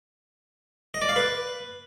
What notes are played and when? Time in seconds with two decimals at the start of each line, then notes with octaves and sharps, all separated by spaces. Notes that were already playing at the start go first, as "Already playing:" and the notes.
0.94 D#5
1.02 D5
1.09 F5
1.16 B4